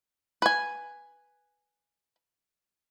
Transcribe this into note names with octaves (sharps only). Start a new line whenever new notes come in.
B4 G#5